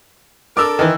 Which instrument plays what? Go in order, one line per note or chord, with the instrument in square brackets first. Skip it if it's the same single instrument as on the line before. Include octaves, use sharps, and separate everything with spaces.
[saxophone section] D4 A4 A#4 [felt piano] D6 E6
[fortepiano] D#3 E3